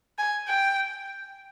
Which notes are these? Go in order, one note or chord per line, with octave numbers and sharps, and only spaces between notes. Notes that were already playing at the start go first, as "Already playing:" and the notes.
G#5
G5